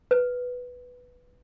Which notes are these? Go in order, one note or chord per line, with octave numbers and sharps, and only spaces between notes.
B4